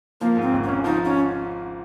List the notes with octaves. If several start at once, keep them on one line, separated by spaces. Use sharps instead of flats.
F3 A#3
G#2
C4
G#1
G#1 C#4
F3 D#4
C#4